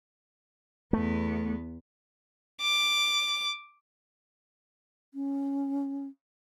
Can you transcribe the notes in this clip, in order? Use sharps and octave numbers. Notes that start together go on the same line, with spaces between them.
E2 A3 B3
D6
C#4